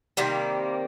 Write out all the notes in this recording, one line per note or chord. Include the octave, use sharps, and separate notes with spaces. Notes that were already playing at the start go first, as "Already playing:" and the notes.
C3 D#3 G3 A#3